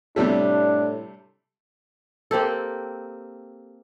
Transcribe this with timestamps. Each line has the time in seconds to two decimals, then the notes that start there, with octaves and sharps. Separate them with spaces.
0.16 A2 C3 G3 A3 D4
2.31 A#3 C4 G4 A4